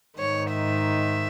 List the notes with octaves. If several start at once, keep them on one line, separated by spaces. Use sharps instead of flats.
G#2 D#3 C#5
E5